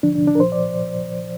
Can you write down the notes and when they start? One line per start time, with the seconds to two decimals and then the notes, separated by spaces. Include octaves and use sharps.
0.03 D2 D3 F3 D4
0.15 D4
0.27 D4
0.35 A#4
0.40 C2 A#2 F3 C5
0.52 D5